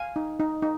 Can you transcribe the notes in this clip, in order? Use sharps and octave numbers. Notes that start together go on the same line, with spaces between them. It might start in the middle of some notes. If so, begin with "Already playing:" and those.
Already playing: F5 G#5
D#4
D#4
D#4